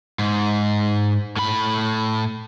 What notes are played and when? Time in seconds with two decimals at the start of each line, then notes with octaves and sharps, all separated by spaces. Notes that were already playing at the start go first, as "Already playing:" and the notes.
0.19 G#2
1.37 A2 B5